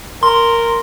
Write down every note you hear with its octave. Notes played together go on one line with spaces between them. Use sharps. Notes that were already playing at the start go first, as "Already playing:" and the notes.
A#4 C6